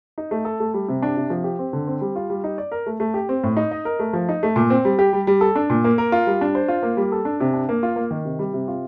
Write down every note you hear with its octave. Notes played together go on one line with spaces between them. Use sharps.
D#4
A3
A4
A3
G3
C3
D4
C3
F3
G4
C4
D3
C4
G3
F4
G3
D#4
D5
A#4
A3
A3
G4
C4
A2
D#4
D#5
A#4
A3
F3
D#4
A3
A#2
C4
G3
G4
G3
G3
A4
D4
A#2
A#3
A#4
F4
G3
D4
C5
F4
A#3
G3
A4
D4
C3
D4
A#3
F4
A#3
D#3
C3
G3
C3
F4